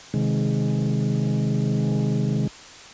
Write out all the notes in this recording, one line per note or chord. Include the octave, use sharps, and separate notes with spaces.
C3 D#3 G#3